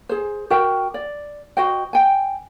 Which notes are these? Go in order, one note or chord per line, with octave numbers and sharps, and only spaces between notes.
G#4 C5
F#4 A#4 G5
D5
F#4 C5 D#5 G5
G5 G#5